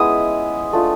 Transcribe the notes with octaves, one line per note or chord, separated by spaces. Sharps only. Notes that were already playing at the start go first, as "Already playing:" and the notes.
Already playing: G#3 B3 C#4 E4 D#6
A3 D4 F4